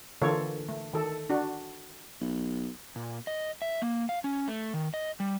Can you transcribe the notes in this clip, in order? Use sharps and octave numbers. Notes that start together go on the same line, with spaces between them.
D3 E3 A#3 F4 A4 C#5
A3
D#3 A4
D4 F#4
B1
A#2
D#5
E5
A#3
F5
C#4
A3
D#3
D#5
G3